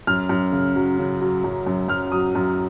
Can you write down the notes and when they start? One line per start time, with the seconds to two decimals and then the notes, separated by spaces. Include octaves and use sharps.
0.07 F#2 F6
0.29 F#2
0.52 C#3
0.75 F#3
0.98 C#3
1.21 F#3
1.44 F#2
1.67 F#2
1.88 F#2 F6
2.12 F#3 D#6
2.35 F#2